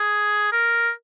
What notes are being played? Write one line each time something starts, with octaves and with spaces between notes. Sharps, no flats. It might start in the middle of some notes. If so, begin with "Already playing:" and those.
Already playing: G#4
A#4